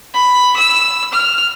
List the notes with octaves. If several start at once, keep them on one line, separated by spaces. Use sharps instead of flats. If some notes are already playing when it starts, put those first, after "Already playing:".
B5
E6
F6